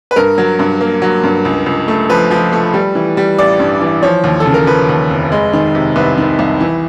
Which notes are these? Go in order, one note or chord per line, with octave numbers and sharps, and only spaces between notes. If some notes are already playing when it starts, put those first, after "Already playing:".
B4
G2 A#4
F#3
G2
A#3
F#3
G2
C#2
C#2
A3
F3 B4
F3
A3
G3
E3
G3
A1 D5
G2
E3
F3 C#5
D#2
A4
C#3
A#4
F3 B4
D#2
F1
G#3
D#3
C3
C2 B4
D#3
C2
E3